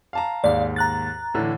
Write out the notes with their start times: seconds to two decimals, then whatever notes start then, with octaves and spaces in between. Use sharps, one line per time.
0.13 F5 A5 A#5
0.44 D#2 G#2 D5 F5
0.76 A#5 F#6 A6
1.34 A2 D3 E3